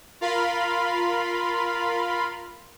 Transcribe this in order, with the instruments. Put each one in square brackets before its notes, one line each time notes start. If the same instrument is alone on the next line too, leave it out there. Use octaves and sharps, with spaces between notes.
[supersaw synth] F4 A#4 F5 B5 C6